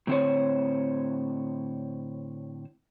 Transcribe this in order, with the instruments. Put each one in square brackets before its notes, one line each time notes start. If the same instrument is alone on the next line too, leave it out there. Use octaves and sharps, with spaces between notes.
[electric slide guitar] A2 D3 C4 F4 C5 C#5